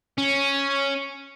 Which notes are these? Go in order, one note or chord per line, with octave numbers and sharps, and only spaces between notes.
C#4